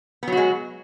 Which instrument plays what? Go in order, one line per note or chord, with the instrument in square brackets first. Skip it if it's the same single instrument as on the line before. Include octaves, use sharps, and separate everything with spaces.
[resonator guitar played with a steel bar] B3
F#3
F#4
G#3